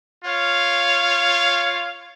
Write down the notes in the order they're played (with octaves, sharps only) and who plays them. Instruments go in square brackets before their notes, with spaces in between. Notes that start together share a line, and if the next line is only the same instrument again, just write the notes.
[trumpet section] F4 C#5 F5